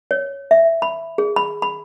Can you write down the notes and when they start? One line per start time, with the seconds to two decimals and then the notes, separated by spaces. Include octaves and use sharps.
0.11 C#5
0.51 E5
0.82 B5
1.18 G#4
1.36 B5
1.62 B5